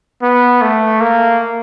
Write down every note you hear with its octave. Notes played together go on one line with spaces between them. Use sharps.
B3
A3
A#3